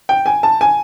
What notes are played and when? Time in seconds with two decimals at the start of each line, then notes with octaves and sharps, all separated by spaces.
0.09 G5
0.26 G#5
0.43 A5
0.61 G#5